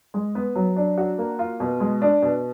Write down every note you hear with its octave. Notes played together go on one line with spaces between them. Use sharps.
G#3
B3
F#3
D4
F#4
A#3
F4
B2
G#3
D4
B2